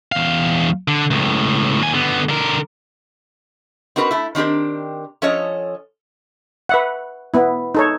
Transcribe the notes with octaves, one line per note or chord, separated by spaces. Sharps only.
E2 F5
D3
C#2 A2
D#2 G#5
D3 B3
D3 A#4
C4 D#4 F#4 A#4 B4
A3 E4
D#3 C4 D4 G4 A#4
F3 C#4 A4 C#5 D#5
B4 E5 F#5
B3 E4
D#4 A4 C#5